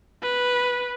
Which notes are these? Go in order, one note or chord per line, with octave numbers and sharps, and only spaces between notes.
B4